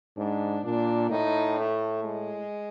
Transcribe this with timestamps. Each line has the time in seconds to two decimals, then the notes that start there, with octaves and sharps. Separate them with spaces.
0.17 G#2 D4
0.64 A#2 D4
1.10 A2 D#4
1.58 A3
2.04 G#3